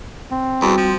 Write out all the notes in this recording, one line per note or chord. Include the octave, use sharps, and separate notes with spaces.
C4
E2 G3 F#4
F3